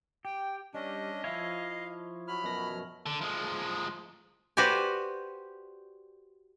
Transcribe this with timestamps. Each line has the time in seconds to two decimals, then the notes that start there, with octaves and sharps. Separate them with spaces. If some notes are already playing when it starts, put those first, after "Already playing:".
0.25 G4 G5
0.74 G3 C#4 D4 D#5
1.24 F3 E4 C#5 E5 F5
2.28 F#3 B5 F6
2.43 F#2 B2 A#6
3.06 D3
3.21 F3 G#3
4.57 F#4 G4 B4 C5 D5 G#5